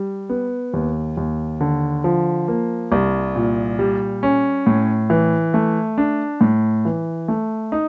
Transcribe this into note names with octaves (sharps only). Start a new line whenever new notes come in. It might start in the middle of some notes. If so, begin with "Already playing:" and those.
Already playing: G3
B3
D#2
D#2
D3
F3
A#3
C2
A#2
G3
C#4
A2
E3
A3
D4
A2
E3
A3
D#4